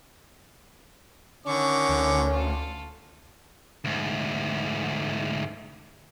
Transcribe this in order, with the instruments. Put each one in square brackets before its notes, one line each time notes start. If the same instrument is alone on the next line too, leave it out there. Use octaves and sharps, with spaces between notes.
[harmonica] D3 D#3 D6 [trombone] C#4 [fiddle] F#5 C#6
[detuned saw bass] D2
[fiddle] F4 A4
[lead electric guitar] D2 G#2